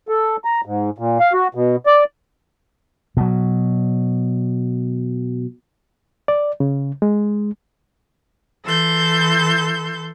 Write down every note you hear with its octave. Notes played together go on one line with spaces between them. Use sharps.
A4
A#5
G#2
A#2
F5
F#4
B2
D5
B2 F#3
D5
C#3
G#3
E3 A4 C6 G6